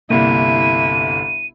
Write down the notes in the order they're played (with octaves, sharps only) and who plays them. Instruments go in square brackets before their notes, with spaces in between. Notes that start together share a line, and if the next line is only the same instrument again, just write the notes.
[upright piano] G1 C2 [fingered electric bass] A#3 [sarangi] E4 [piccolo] D#7